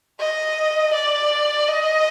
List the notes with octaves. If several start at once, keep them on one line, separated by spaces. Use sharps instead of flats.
D#5
D5
D#5